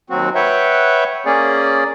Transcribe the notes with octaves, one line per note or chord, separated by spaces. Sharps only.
D#2 F#3 C4 F#4
B4 C#5 E5 F#5 G5
A#3 C#4 G#4 D5